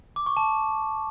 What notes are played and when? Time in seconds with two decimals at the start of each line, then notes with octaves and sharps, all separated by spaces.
0.16 D6
0.26 C#6
0.37 A5